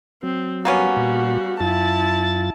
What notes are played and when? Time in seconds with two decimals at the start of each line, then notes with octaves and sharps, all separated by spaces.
0.23 F#3 C4
0.65 G3 A#3 B3 C#4 F#4
0.97 A#2
1.60 F#2 E4 F4 A5 A6